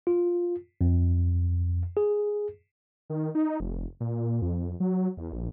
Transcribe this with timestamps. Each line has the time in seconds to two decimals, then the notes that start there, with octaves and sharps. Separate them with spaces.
0.07 F4
0.81 F2
1.97 G#4
3.10 D#3
3.35 D#4
3.60 F1
4.00 A#2
4.15 A#2
4.42 F2
4.80 F#3
5.17 E2
5.33 A#1